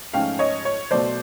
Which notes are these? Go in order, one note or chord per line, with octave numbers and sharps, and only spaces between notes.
G#2 F3 A3 C#4 F5 G5
C#5 D#5
C#5
B2 F#3 A3 C5 D5